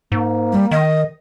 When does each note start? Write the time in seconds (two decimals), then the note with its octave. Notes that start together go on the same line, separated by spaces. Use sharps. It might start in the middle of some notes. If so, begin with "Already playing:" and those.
0.12 G#2 A#3
0.53 G3
0.71 D#3 D#5